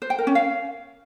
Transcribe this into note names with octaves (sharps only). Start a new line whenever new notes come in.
C5
G5
A#4
C#4
F5